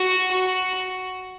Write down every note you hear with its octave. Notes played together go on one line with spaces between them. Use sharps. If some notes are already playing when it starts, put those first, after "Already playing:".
Already playing: F#4
F#4